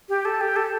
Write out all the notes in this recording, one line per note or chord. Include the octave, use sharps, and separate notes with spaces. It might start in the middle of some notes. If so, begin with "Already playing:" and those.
G4
A4
G4
A4